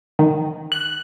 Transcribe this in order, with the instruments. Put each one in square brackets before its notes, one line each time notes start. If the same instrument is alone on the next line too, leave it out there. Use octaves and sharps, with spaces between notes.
[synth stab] D#3
F#6